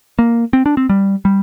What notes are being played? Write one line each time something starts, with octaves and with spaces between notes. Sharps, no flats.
A#3
C4
D4
C4
G3
G3